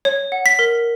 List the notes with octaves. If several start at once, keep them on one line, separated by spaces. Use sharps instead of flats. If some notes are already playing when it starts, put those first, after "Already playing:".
C#5
F#5
B6
A#4